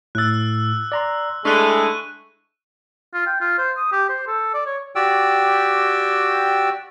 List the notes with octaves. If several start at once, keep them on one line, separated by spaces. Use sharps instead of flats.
A2 E6 F#6 A6
D5 A#5 C6
G#3 A3 D4 E4 C#6 F#6 D#7
F4
G5
F4
C5
D#6
G4
C5
A4
D5
C#5
F#4 G4 D5 G5 E6